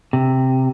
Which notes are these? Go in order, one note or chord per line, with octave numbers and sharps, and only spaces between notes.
C3